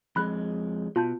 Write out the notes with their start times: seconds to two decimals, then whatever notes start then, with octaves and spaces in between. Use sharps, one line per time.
0.16 F2 G#3 B5 F#6
0.96 B2 F4 A5 G6